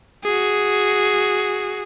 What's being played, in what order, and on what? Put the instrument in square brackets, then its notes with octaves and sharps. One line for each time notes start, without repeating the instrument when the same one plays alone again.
[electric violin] F#4 G#4